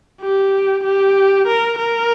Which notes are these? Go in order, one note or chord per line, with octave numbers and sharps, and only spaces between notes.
G4
G4
A#4
A#4